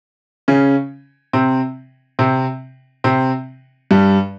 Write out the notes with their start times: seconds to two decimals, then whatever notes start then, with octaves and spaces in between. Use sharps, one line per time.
0.48 C#3 C#4
1.33 C3 C4
2.19 C3 C4
3.04 C3 C4
3.91 G2 G3